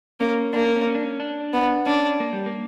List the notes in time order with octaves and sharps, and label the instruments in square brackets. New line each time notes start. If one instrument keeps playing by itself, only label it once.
[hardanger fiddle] A#3 [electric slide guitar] C#4
[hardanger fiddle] A#3 [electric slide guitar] D4
[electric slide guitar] C#4
C#4
C#4
D4
C#4
D4
[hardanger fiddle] B3
[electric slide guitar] C#4 [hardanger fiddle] D4
[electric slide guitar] A#3
G3
A#3